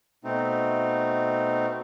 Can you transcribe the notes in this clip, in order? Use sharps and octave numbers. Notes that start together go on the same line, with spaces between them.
B2 A3 C4 D#4